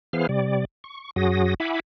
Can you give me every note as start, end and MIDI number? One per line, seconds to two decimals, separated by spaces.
0.13 0.27 52
0.13 0.27 59
0.13 0.27 68
0.13 0.27 72
0.13 0.27 77
0.13 0.27 89
0.29 0.65 48
0.29 0.65 55
0.29 0.65 74
0.84 1.11 85
1.16 1.54 42
1.16 1.54 54
1.16 1.54 66
1.16 1.54 68
1.16 1.54 87
1.16 1.54 94
1.60 1.80 64
1.60 1.80 76
1.60 1.80 78
1.60 1.80 80
1.60 1.80 83
1.60 1.80 86